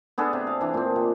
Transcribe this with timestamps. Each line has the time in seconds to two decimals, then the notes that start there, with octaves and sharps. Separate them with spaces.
0.18 B3 D4 G#4 A4
0.33 C3
0.47 F5
0.61 E3 D4
0.74 A#2 C4
0.96 C3